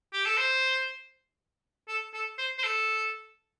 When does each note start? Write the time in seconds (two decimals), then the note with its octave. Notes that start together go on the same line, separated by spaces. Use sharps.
0.13 G4
0.25 A4
0.37 C5
1.88 A4
2.13 A4
2.38 C5
2.58 C5
2.63 A4